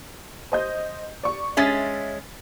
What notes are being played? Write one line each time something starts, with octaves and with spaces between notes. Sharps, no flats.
C5 D#5 G6
D5 C#6
G#3 C#4 E5 A6 B6